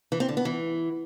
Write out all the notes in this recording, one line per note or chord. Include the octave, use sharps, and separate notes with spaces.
E3
C4
D3
B3
E3